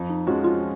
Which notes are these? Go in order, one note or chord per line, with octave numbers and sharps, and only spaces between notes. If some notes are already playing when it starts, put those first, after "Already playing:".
Already playing: F2
D#4
F3 G#3 C#4 F4 F#4
F4